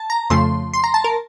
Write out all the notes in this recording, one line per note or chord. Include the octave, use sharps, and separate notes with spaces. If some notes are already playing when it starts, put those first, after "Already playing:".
Already playing: A5
A#5
F2 C#3 F3 A3 C6
C6
A#5
A5
A#4